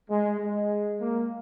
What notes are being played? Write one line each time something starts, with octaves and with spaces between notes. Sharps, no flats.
G#3
G#3
A#3